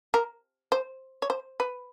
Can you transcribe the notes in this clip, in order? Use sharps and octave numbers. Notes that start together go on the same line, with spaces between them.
A#4
C5
C#5
C5
B4